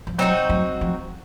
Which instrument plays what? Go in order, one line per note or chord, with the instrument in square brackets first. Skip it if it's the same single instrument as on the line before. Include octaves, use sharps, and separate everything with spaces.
[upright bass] F3
[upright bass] F#3 [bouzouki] C4 D#4 F#4
[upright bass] F#3
F3